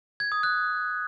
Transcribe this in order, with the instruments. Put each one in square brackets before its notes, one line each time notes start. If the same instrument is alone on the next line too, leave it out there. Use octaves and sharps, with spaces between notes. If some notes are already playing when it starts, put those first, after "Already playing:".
[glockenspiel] G#6
D#6
F#6